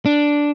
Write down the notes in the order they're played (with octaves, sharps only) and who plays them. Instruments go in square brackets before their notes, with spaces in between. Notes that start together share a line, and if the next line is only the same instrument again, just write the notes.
[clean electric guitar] D4